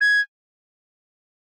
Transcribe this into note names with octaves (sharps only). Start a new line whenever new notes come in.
G#6